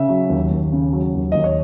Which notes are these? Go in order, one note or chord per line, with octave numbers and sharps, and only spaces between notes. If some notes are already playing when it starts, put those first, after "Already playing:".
Already playing: C#3 E5
F#3
D#2
D#2
C#3
F#3
D#2
D#2 D#5
C#5